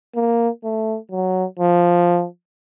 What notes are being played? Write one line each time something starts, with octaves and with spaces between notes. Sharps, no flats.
A#3
A3
F#3
F3